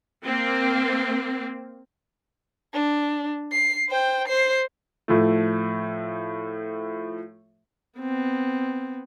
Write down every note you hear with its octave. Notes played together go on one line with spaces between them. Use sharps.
A#3 C4
D4
C7
C5 G5
C5 C7
A2 F3 A3
B3 C4